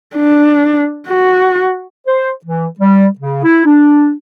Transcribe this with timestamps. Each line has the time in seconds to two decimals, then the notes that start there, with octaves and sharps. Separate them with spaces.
0.15 D4
1.08 F#4
2.07 C5
2.45 E3
2.80 G3
3.19 C#3
3.44 E4
3.65 D4